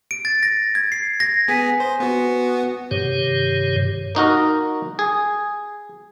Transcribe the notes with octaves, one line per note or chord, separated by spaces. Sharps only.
D7
A6
A#6
G#6
C7
A#6
B3 G#4 G#5 B6 D#7
C5
B3 F#4
G2 C3 D#3 G4 C#5
A#3 D#4 F#4 A#4
G#4